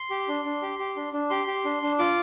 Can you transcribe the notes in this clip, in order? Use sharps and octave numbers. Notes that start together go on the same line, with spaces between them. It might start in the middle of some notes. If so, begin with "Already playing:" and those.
Already playing: C6
G4
D4
D4
G4
G4
D4
D4
G4 C6
G4
D4
D4
F4 D6